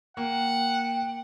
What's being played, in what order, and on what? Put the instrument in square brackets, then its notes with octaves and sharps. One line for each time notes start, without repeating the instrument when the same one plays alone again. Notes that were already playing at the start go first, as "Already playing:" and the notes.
[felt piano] A#3 [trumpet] F#5 [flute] G5